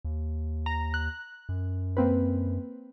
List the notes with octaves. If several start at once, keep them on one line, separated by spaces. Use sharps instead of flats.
D#2
A#5
F#6
F#2
A#3 C4 B4